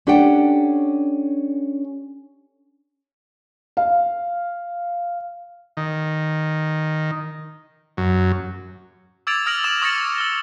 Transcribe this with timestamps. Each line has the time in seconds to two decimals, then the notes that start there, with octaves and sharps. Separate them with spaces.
0.07 C#4 D4 G4 A4 F#5 G5
3.77 F5
5.77 D#3
7.97 F#2
9.27 D6 E6 G#6 A6 D7 F7
9.46 D#6 F6 A#6 D7 F7 F#7
9.64 D6 E6 E7 F#7
9.82 C#6 D#6 F6 A6 A#6 C#7
10.18 E6 G7